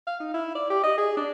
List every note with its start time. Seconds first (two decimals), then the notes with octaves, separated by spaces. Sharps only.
0.07 F5
0.20 D#4
0.34 E4
0.55 D5
0.70 G4
0.83 D#5
0.98 G#4
1.17 D4